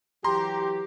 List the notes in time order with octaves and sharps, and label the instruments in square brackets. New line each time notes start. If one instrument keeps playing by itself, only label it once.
[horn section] E3 F#3 G4 [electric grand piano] A#5 C6